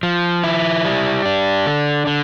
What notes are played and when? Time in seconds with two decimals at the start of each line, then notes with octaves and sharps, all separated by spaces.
0.03 F3
0.44 E4
0.85 G3
1.25 D4
1.66 D3
2.07 D3